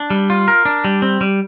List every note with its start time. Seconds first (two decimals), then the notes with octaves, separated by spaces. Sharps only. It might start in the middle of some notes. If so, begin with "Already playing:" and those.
Already playing: D4
0.10 G3
0.30 F4
0.48 A#4
0.65 D4
0.84 G3
1.02 C4
1.21 G3